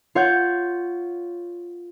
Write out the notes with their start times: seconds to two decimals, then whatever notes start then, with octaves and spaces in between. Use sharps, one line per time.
0.15 F4 C#5 F#5 F#6 G6